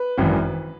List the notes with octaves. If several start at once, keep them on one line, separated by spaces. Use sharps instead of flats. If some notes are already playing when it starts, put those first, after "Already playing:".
Already playing: B4
G#1 F#2 E3